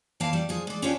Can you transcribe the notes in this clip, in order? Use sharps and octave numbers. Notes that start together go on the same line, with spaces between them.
G2 E3 A#3 F5 A5
G3
F3 G#4
G#3 D5
C#4 D4 F4 G4 C#5 G#5